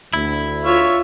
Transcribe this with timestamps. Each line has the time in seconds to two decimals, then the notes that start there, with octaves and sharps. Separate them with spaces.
0.13 D2 E4
0.65 F4 C#5 E5